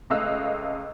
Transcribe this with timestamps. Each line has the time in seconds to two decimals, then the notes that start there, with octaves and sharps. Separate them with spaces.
0.10 C#2 A3 D#5 F5 E6 F#6